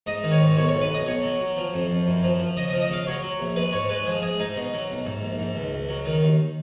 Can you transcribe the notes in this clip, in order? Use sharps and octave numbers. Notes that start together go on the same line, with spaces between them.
G#2 D#5
D#3
C#5
G#2
B1 C#5
C#5
B1
B4
B1
D#5
B1 C#5
F#3
F#3
F3
F2
F2
F#2
F3
F3
C#3 D#5
D#5
F3
D#5
C#3 F5
F#3 C#5
F#3
A#1
G#3 B4
G#2 C#5
G#3 B4
F3 G#4
G#3 G#4
G#2 D#4
B2
F#3
B1
G#2
A#1
G#2
C#2
C#2
F#3
D#3
D#2